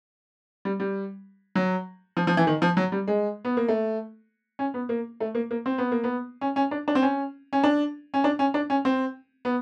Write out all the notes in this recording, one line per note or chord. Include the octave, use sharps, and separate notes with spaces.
G3
G3
F#3
F3
F3
E3
D#3
F3
F#3
G3
G#3
B3
A#3
A3
C#4
B3
A#3
A3
A#3
A#3
C4
B3
A#3
B3
C#4
C#4
D4
D4
C4
C#4
C#4
D4
C#4
D4
C#4
D4
C#4
C4
B3